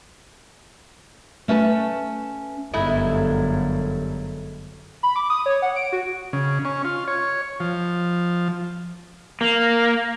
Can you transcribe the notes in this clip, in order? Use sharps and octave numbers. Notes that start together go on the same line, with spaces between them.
A3 C#4 B4 A5
G1 F#2 G#3 A3 E4
B5
D6
D#6
C#5
F#5
D7
F#4
C#3
C#4
F4
C#5
F3
A#3